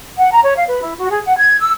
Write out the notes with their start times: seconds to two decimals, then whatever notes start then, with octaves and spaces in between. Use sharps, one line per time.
0.18 F#5
0.31 A#5
0.43 C#5
0.55 F5
0.68 B4
0.81 E4
0.97 F#4
1.11 G#4
1.25 F#5
1.37 G#6
1.60 E6